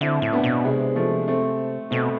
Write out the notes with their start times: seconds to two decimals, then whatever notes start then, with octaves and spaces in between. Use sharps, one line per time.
0.01 D3 C4 E4
0.22 A2
0.33 B3 D4
0.44 B2
0.65 C3 G#3
0.96 F3 A3
1.28 A3 C4
1.91 B2 A3 C4